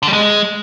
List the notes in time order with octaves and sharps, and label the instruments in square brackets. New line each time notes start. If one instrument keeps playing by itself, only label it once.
[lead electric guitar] D3
G3
G#3